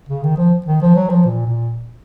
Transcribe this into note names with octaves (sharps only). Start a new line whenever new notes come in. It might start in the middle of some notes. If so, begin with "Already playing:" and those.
C#3
D#3
F3
D#3
F3
F#3
F3
A#2
A#2